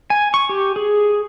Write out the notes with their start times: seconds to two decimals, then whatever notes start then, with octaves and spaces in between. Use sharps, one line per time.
0.10 G#5
0.34 C#6
0.49 G4
0.76 G#4